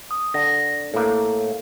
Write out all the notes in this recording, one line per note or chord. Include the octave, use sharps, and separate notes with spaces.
D#6
D3 A#6
A2 A#3 A4